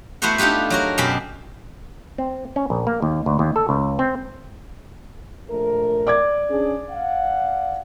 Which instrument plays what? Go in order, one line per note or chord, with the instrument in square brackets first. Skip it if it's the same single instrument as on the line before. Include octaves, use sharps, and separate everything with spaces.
[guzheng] A3 B3 E4 F#4 C5 F#5
D4 D#4 F4 G4 B4
F#3 F#4 A#4
F#2 B2 G4 G5 B5
[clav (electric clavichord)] C4
C#4
A#1
A#3
D#2
D2
D#2
A4
C#2
C4
[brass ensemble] A#1 A3 A#4
[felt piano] D5 D6 G#6
[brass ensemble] C#4 D4 G#4
F5 F#5